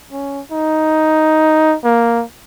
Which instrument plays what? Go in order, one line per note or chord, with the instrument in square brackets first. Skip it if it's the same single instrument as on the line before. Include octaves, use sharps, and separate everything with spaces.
[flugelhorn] C#4
D#4
A#3